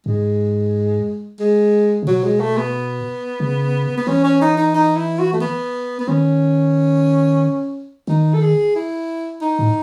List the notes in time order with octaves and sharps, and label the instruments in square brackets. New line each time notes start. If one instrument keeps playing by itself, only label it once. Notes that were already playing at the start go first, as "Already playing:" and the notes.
[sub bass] G#2 [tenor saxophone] G#3
[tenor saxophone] G#3
[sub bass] C#3
[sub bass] B2 [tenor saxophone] F#3
[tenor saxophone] G#3
A3
B3
[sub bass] C#3
[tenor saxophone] B3
[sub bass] E3 [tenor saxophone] C#4
[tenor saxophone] C#4
D#4
D#4
D#4
E4
F#4
A3
B3
B3
[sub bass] D#3 [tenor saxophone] C#4
[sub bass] D#3 [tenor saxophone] D#4
[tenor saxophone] A4
G#4
E4
D#4
[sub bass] A2